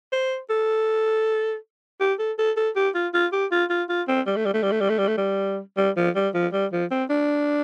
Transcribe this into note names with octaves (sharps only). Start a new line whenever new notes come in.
C5
A4
G4
A4
A4
A4
G4
F4
F4
G4
F4
F4
F4
C4
G3
A3
G3
A3
G3
A3
G3
A3
G3
A3
G3
G3
F3
G3
F3
G3
F3
C4
D4